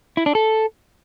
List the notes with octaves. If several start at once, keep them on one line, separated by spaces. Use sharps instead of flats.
E4
D4
A4